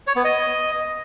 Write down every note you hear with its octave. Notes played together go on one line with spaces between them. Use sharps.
C#5
B3
D#5